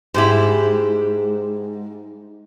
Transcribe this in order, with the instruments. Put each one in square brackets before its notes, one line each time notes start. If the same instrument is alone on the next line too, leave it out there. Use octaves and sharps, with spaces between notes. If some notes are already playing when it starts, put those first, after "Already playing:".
[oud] G#2 [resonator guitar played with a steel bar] E4 G4 C5